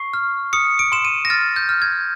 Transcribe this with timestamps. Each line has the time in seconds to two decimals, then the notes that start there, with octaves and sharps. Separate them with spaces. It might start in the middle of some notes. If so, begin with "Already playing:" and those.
Already playing: C#6 C7
0.14 F6
0.53 D#6 C#7
0.79 D7
0.92 C6 E7
1.05 D#7
1.25 A#6
1.30 F6 A6
1.56 G6
1.69 F6
1.82 G#6